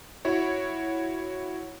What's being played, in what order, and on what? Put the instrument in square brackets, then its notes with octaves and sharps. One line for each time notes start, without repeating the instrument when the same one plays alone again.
[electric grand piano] E4 F#4 C#5